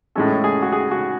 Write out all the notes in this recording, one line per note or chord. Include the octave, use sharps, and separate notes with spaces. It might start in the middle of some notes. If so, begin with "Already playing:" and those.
A2 G#3 C#4 A4
G#4
F#4
G#4
F#4